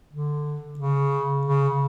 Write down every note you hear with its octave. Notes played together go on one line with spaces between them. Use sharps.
D3
C#3
C#3